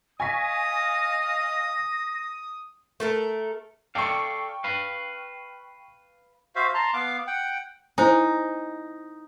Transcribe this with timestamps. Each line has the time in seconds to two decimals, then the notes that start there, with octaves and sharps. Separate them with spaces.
0.20 D#5 F5 G#5 C#6 D#6 A#6 B6
3.00 A3 A4 A#4
3.95 A4 D5 F5 G5 C#6
4.64 B4 F5
6.55 F#4 C5 E5 F5
6.75 A5 A#5 C6
6.93 B3 F5 D6
7.27 F#5 G5
7.98 D#4 E4 C5 G#5